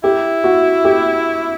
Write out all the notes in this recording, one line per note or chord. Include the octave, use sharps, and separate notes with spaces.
E4 G4
F#4
G4